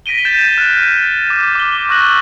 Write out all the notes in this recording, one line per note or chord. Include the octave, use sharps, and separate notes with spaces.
A#6 B6 D7 D#7 G7
G6 A6 E7 G7
F6 F#6
D6
D6 G7
C#6 E6 F#6 A#6 F#7